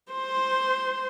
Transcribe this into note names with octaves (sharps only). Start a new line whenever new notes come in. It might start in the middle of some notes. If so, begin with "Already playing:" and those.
C5 C6